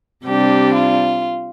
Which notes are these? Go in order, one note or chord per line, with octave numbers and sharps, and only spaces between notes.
C3 G3 D4 G4
F4